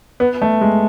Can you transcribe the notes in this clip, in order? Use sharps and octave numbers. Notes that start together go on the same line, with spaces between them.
B3
A3
G#3